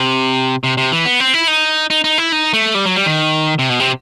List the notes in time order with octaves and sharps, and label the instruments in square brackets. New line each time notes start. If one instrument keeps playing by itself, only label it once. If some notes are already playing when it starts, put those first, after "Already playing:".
Already playing: [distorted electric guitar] C3
C3
C3
E3
B3
C4
E4
D#4
D#4
D#4
E4
D#4
A3
G3
F#3
G3
D#3
C3
B2
C3